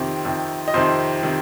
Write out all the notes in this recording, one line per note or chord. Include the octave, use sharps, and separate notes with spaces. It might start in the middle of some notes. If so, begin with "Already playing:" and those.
Already playing: F2 C3 D#3 C5
F2 C3 D#3
D#5
F2 C3 D#3 C5
C3 D#3